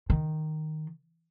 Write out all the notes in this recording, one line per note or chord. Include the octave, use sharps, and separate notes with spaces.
D#3